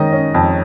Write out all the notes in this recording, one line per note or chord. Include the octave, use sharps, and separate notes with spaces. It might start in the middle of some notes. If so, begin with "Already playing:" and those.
Already playing: D#3 G#3 C#4 D#5
C#4
F2